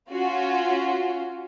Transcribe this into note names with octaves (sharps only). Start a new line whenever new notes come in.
C#4 F4 F#4